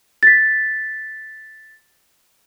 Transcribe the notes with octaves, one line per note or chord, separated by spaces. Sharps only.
A6 B6